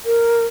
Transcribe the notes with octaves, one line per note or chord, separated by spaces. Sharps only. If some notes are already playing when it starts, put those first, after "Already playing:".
A#4